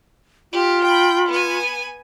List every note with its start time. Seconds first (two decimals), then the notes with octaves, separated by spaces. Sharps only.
0.53 F4 G4
0.84 G5 B5
1.29 B3 G#5